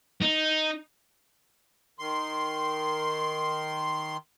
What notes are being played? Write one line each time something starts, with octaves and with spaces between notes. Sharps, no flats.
D#4
D#3 C6